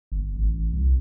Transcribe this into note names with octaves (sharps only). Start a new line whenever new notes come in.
G1
A1
C2